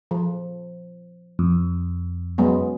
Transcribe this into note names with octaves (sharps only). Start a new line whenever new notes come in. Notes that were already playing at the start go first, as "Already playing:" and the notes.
F3
F2
F#3 G#3 B3